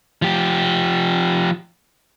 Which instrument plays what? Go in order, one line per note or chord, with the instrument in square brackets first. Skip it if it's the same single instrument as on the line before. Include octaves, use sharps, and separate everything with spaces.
[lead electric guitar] F3 G4